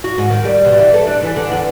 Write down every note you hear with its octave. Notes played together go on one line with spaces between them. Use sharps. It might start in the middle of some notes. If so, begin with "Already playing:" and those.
F#4
G#2
D#3
G3
B2
E3
A4
D4
E3
D3
E2